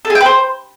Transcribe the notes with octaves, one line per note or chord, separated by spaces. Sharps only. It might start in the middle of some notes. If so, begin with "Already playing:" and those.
A4
G#4
G5
B4
C5